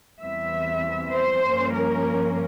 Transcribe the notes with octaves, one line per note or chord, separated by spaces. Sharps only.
E2 E3 G3 C4 E5
C5
G2 F3 A#3 C#4
A#4